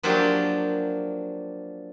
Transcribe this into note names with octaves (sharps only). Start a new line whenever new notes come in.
F3 F#3 A#3 D4 G4